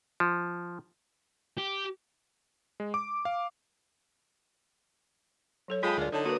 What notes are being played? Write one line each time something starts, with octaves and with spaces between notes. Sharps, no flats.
F3
G4
G#3
D6
F5
F#3 A4 C#5
G#3 F4 F5 G5 A5 B5 D#6
D2 F4 A#4 D5
D3 D#4 C#5 A5
A#3 F#4 B4 D#6